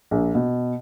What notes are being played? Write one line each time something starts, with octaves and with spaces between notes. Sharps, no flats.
A#1
B2